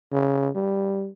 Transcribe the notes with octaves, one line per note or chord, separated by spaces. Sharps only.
C#3
G3